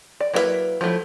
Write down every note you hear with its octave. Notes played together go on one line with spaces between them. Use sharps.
D5
F#3 A#3 E4 F#4 B4
F3 F#3 A3 E4